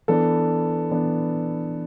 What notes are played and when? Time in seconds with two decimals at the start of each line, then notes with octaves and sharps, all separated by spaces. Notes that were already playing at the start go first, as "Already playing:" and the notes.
0.08 E3 B3 D4 A4
0.91 E3 B3 D4